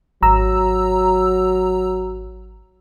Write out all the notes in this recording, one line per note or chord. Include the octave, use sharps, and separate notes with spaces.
G#1 F#3 A#5 E6